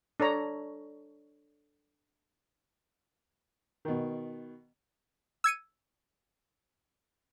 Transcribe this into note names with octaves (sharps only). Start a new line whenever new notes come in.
D4 A4 C#5 A#5
B2 D#3
E6 G#6 C#7 D#7